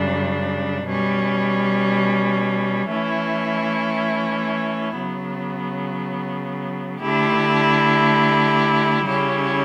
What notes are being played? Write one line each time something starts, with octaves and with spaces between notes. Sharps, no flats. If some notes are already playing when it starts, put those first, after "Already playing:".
Already playing: F#2 C#3 G3 D4
B2 G3 C#4
E3 A3 C#4 E4
C#3 F#3 B3
D3 A3 E4 G4
C#3 G3 C#4 E4 G4